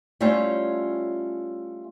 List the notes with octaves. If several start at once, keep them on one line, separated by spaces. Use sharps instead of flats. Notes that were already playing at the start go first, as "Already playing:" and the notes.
G3 A3 C#4 E4 F4 C#5